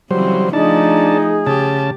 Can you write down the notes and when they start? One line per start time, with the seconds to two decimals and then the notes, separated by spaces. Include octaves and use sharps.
0.11 C#3 E3 F#3 G3 C4 C5
0.53 F3 A3 D4 D#4 G#4 A5
1.47 C#3 G4 A5